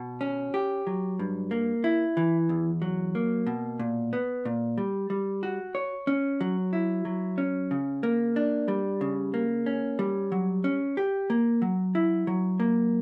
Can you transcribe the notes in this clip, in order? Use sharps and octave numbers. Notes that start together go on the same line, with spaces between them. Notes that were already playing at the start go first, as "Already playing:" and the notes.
Already playing: B2
C#4
G4
F#3
G2
A#3
E4
E3
E2
F#3
A#3
B2
A#2
B3
A#2
G3
G3
F#4
C#5
C#4
F#3
E4
F#3
C#4
C#3
A#3
D4
G3
C#3
A#3
C#4
G3
F#3
C#4
G4
A#3
F#3
E4
F#3
A#3